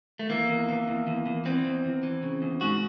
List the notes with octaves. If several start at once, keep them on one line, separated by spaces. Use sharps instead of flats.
A3
E3 A#3
E2
E3
E2
E2
E2
E3 C4
E2
E2
E3
C#3
E2
G#2 F#4